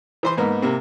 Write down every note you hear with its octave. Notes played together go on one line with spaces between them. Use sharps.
E3 C5 C6
G#2 A#3 B3 D#4
C3 A#3